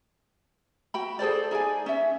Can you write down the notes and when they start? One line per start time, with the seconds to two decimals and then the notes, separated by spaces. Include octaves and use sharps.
0.94 F#4 G5 B5
1.19 G#4 A4 C5 D5
1.51 D#4 G#4 D5 G#5
1.86 C#4 E5